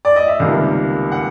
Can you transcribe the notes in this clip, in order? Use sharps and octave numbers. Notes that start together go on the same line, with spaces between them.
D5
D#5
E5
C#2 C3 D#3 G3 A#3 F5
F#5